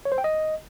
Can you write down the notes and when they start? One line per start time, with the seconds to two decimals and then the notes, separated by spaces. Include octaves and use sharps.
0.05 C#5
0.12 C5
0.18 G5
0.24 D#5